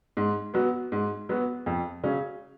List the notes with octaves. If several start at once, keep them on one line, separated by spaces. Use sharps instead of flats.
G#2
F#3 B3 F#4
G#2
F#3 B3 F#4
F2
C#3 F#3 C#4